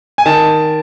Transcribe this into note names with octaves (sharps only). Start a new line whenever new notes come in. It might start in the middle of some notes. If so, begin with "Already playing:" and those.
G#5
D#3 A5